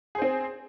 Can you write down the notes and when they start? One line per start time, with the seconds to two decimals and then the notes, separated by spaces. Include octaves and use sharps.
0.15 G#4
0.18 C5
0.22 C4